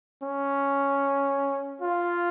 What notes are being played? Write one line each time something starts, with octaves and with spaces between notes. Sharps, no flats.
C#4
F4